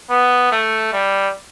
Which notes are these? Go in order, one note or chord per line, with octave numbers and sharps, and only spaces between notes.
B3
A3
G3